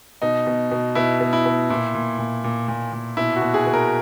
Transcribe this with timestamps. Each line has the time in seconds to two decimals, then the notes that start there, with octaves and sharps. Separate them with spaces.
0.22 B2 D#4
0.47 B2
0.71 B2
0.95 B2 E4
1.21 B2
1.33 E4
1.46 B2
1.70 A#2 E4
1.95 A#2
2.18 A#2
2.44 A#2
2.68 A#2
2.92 A#2
3.17 B2 E4
3.36 F#4
3.42 B2
3.54 G#4
3.66 B2
3.73 A#4